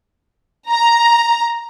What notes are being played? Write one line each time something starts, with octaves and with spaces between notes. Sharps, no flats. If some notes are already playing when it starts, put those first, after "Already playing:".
A#5